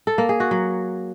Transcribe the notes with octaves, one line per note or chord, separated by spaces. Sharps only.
A4
A#3
G#4
F#4
F#3